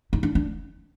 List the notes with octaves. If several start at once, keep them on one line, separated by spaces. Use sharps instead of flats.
D#4
D4
D4